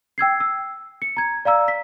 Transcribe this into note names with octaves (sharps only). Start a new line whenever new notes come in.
G5 E6 G#6 C7
E6
C#7
A#5 G#6
D5 F5 A#5 E6
B6